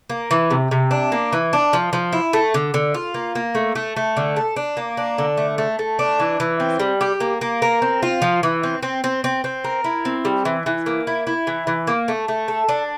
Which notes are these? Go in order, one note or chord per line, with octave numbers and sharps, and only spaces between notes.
A#3
E3
C3
C3
D4
A#3
E3
D4
F3
F3
E4
A3
D3
D3
F4
A#3
A#3
A3
A3
A3
D3
A4
D4
A#3
D4
D3
A3
A3
A3
D4
E3
E3
C4
G3
G4
A#3
A#3
A#4
C4
F4
F3
E3
C4
C4
C4
C4
C4
A#4
E4
C4
G3
E3
E3
A#3
E4
E4
E3
E3
A#3
A3
A3
A4
D4